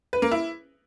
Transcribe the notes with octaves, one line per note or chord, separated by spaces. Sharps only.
B4
A#3
E4